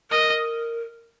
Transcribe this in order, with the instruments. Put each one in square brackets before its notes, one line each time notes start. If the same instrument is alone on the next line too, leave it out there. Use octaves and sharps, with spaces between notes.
[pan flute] A#4 [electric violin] D#5